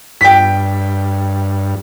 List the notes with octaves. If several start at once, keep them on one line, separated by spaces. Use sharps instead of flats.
G2 G5 B6